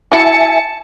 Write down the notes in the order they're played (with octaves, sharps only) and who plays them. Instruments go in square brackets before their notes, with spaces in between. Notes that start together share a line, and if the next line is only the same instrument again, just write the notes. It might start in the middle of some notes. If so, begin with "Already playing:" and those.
[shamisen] E4 F#4 [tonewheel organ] E5 G#5 [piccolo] A5 [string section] C#7